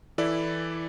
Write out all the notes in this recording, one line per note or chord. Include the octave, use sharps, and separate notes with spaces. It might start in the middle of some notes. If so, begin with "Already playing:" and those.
E3 E4 A4 D5